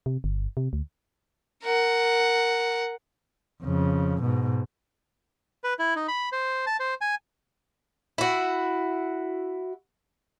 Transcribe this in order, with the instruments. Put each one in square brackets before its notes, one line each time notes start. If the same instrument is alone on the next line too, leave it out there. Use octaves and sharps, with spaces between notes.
[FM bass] C3
G1
C3
D2
[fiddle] A#4 F#5
[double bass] F2 C#3
G#2 B2
[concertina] B4
E4
D#4
B5
C5
A5
C5
G#5
[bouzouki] E4 F#4